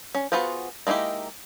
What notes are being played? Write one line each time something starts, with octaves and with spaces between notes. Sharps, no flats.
C#4
B3 F4 F#4 G#4 C5
G#3 A#3 D#4 E4 G4